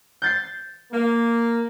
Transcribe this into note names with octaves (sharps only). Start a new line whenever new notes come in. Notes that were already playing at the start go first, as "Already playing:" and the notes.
G6 A6 C7
A#3